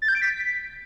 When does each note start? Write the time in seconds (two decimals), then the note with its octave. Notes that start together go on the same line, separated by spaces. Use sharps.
0.02 A6
0.08 G6
0.15 D7
0.22 B6